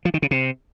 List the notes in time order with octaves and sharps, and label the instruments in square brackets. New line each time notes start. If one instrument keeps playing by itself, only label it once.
[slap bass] F3
D#3
C#3
C3